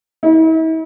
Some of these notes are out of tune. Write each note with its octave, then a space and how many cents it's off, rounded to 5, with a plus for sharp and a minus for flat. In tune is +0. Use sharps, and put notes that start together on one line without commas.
E4 -45